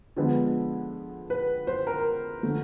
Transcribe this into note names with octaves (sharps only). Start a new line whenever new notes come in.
D3 F3 G#3 B3
B4
C5
A#4
D3 F3 A3